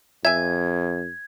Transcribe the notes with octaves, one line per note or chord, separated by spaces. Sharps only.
F2 E5 G#5 G#6